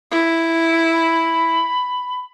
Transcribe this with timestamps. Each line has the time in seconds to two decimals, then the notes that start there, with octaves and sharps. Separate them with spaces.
0.12 E4
0.93 B5